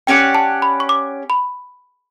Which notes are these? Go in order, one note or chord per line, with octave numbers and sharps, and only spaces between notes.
C#4 G4 D5 F#5 G5
A5
B5
C#6
D6
B5